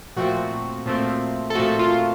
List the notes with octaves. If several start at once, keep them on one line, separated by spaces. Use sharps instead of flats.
A#2 F3 A3 C4 F#4
A#2 F3 A3 C4
A4
A#2 F3 A3 C4 F#4
F4